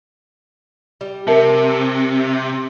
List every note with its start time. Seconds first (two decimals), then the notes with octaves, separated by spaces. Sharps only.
1.01 G3
1.27 C3 A#4 E5 A5